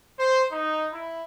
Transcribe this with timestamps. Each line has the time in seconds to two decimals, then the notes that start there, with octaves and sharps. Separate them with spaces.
0.19 C5
0.52 D#4
0.93 E4